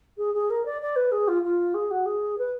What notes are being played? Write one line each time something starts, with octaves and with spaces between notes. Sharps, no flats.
G#4
G#4
A#4
D5
D5
B4
G#4
F4
F4
G#4
F#4
G#4
B4